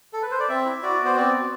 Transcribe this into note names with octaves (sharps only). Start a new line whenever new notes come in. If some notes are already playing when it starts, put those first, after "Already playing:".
A4
B4
C5
D5
C4 E5
E4
F#4 D5
B3
C5
C4 D5
F#4